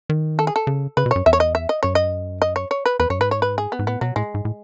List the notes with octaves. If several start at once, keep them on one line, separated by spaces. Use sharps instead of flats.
D#3
A4
G#4
A4
C#3
C#3 B4
B2
F#2 C#5
E2 E5
C#5
D#5
E5
D#5
F#2 C#5
D#5
D#5
C#5
C#5
B4
E2 B4
F#2 C#5
G#2 B4
C#5
B4
G#4
B3
G#2
A2 B3
B2 F#3
A2 G#3
G#2
A2